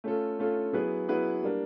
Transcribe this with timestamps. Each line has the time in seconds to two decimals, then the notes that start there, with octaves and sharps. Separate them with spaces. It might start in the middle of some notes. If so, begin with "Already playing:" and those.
0.04 A3 C#4 F4 A4
0.39 A3 C#4 F4 A4
0.73 F#3 B3 E4 G#4 B4
1.08 F#3 B3 E4 G#4 B4
1.43 G3 A#3 D4